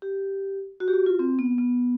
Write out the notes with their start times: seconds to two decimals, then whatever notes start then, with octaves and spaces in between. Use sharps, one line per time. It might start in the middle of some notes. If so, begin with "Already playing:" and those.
0.02 G4
0.80 F#4
0.88 G4
0.93 F#4
1.06 F4
1.19 C4
1.39 B3
1.58 B3